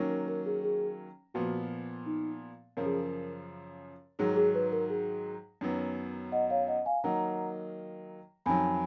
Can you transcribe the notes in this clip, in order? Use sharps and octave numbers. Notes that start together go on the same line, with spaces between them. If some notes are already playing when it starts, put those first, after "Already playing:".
Already playing: D#3 F#3 A#3 C#4
A#4
A#4
G#4
G#4
A#2 F3 B3 F#4
D#4
F#2 C#3 F3 A#4
G#4
A#4
G#2 D#3 F#3 G#4
G#4
B4
A#4
G#4
F#2 D#3 F#3 B3
D#5 F#5
C#5 F5
D#5 F#5
F5 G#5
D#3 F#3 A#3 D#4 F#5 A#5
F2 D#3 F#3 G#5 B5